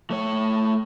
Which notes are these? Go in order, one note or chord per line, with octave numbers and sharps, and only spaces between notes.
A3 C#5